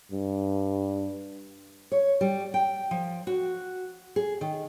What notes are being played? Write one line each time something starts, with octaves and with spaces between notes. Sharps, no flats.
G2
C#5
G3
G5
F3
F#4
G#4
D#3